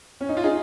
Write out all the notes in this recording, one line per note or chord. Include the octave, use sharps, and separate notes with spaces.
C#4
D#4
F4
D#4 G#4